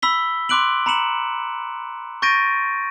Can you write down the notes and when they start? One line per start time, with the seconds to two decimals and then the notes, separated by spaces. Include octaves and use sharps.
0.02 B5 E6 B6 G7
0.49 B5 C6 D6 F#6 D7 F#7
0.86 A#5 B5 C#7 E7 F#7
2.22 C#6 G6 A6 A#6 D7 D#7